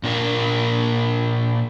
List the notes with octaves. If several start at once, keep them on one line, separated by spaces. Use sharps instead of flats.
A#2 D4 A#4 F5